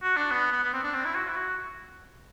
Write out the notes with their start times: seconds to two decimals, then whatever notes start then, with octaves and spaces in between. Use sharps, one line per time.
0.02 F#4
0.16 D4
0.31 B3
0.52 B3
0.63 B3
0.73 C4
0.83 D4
0.94 C4
1.05 E4
1.15 F#4
1.28 E4
1.36 F#4